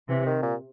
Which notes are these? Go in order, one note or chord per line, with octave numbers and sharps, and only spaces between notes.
C3 E3
D#3
A#2